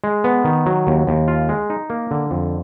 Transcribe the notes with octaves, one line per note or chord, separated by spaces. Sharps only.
G#3
B3
D#3
F#3
D#2
D#2
F4
G#3
D#4
A#3
D3
F2